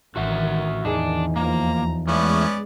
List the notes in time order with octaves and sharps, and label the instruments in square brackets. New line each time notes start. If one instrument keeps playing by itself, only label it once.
[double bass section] A1 D#3 [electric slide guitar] F#4 E5 F#5
[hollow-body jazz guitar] E2 D#4 G#4 [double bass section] D#3 [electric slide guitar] D4
[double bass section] D#2 F3 [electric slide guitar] A#3 [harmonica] A#5
[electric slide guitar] E3 A3 [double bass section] G#3 [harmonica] B3 C#4 D5